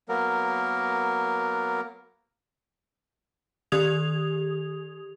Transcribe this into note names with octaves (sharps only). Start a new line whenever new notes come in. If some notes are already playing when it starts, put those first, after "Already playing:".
F#3 A#3 B3 A#4
D#3 G4 D#6 G#6 F7